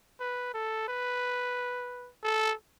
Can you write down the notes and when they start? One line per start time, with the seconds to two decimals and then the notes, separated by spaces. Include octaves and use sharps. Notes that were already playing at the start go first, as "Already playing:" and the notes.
0.20 B4
0.54 A4
0.88 B4
2.24 A4